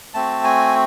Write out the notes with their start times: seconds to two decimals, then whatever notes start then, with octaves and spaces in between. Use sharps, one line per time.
0.14 A3 C4 F#4 A5
0.44 G#5